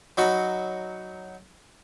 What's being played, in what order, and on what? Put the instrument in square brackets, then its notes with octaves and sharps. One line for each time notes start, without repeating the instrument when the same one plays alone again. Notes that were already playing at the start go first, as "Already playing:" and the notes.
[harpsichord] F#3 D#4 F#4 B5